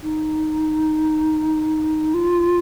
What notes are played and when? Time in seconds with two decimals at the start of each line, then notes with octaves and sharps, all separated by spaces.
0.03 D#4
2.14 F4